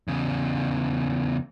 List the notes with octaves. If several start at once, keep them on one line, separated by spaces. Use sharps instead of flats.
E2 C#3